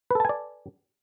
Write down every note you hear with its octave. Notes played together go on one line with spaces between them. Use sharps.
A4 B4 D5 G#5 A5